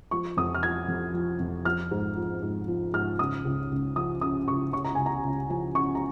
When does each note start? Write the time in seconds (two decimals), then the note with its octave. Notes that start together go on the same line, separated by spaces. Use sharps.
0.11 F3 C#6
0.37 F2 D#6
0.55 F6
0.63 F3 G#6
0.88 F2
1.14 F3
1.40 F2
1.65 F3 F6
1.91 G#2
2.17 F3
2.42 G#2
2.68 F3
2.93 G#2 F6
3.19 C#3 D#6
3.45 C#2
3.71 C#2
3.96 F3 D#6
4.21 C#3 D#6
4.47 C#2 C#6
4.73 C#3 C#6
4.85 A#5
4.95 C#2 G#5
5.06 A#5
5.24 C#2
5.50 F3 G#5
5.75 C#3 C#6
5.95 A#5